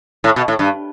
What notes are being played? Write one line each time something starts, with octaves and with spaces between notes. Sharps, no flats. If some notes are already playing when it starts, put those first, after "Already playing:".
A2
B2
A2
G2